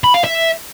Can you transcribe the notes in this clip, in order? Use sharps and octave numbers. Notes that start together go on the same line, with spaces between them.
B5
F5
E5